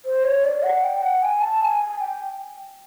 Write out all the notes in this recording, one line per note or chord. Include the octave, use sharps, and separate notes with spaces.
C5
C#5
D5
F#5
G5
F#5
G#5
A5
G#5
G5